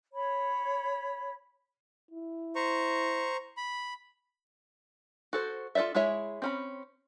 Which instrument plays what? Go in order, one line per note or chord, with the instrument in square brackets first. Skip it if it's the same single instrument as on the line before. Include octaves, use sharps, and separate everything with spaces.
[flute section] C#5 B5
[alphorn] E4
[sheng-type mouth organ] C5 A#5 C#6
B5
[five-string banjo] F#4 A4 C5
F4 A4 C5 D5 E5
G#3 E4 G#4 C#5 E5
C4 C#4 B5